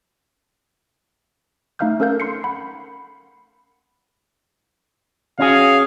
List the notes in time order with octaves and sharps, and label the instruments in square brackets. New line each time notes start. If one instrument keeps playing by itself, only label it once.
[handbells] A3 D#4 E5 F5 F6 G6
C#4 A4 A#4 F5 G6
C6 C7 C#7
F#5 B5
[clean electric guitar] C#4 F#4 G#4 [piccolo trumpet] F5